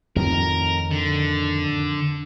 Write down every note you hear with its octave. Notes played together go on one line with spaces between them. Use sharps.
F2 A2 D#3 A#4
D3